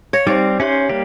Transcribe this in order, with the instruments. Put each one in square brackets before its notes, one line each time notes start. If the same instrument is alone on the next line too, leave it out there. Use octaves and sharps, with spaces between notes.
[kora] C#5 [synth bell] F5 A#6
[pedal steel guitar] G3 C4 [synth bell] D#4 G4 C5 [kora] D5
[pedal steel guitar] C#4 C5 [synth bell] G4 C#5 E5
[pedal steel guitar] G3 A#3 G4 [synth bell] C#5